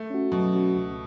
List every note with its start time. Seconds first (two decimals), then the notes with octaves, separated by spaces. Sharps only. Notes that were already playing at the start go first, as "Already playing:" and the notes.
Already playing: A3
0.10 C#4 F#4
0.32 B2 F#3
0.54 C#4 F#4
0.76 C#2